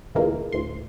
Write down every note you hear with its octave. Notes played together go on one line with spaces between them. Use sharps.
D2 A#2 D3 E3 G#3 A#3
D2 A2 C6